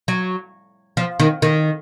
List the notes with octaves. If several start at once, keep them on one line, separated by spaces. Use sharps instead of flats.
F#3
F3
D#3
D#3